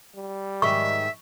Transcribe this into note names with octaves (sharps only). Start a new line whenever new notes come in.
G3
G#2 D#3 E5 C#6